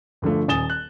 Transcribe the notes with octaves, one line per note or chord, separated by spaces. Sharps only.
G2 D3 F3 A3
D#1 G#5 D#6 A6 E7 G7
F#6